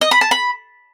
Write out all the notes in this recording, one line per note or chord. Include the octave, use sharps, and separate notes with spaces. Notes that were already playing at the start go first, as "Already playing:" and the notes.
D#5
B5
A5
B5